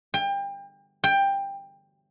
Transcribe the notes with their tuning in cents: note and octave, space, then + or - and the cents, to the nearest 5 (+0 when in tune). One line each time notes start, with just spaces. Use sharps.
G5 +30
G5 +15